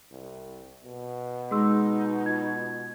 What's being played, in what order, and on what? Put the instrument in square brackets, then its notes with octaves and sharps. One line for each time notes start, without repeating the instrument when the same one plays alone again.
[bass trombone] C2
B2
[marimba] G#3 [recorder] D#4 [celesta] G#4 C6 E6
[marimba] F4 [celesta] G#6